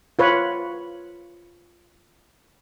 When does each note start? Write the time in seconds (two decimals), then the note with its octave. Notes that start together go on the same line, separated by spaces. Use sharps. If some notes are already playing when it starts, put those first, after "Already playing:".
0.19 F4 B4 C#5